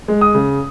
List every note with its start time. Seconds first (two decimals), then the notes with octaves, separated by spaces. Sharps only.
0.08 G#3
0.21 D#6
0.35 C#3